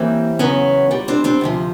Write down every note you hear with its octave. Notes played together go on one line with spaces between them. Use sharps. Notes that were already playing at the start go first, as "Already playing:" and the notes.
Already playing: A2 E3 G3 A#3 C4
E2 C#3 F#3 B3 C#4
A#2 G3
C4 D4
C4 D4
D2 C3 F3